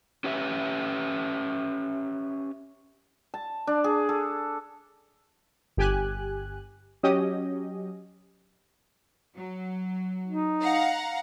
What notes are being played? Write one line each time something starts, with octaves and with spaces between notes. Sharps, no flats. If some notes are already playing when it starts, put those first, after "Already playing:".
C#4 G4 B4 E5
A5
D4
G#4
A4
G1 G4 G#5 F#6
F#3 C#4 G4 D#5
F#3
D#4
F5 F#5 A#5